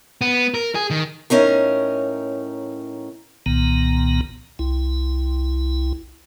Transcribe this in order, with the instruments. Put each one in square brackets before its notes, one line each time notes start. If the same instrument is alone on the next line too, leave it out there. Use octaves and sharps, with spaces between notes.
[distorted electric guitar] B3
A#4
G#4
D#3
[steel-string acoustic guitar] A2 C#4 D#4 A#4
[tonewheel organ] C2 A#2 D#3 B3 A#5
C2 E4